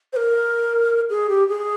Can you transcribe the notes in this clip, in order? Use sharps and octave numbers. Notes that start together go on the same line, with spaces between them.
C5
A#4
G#4
G4
G#4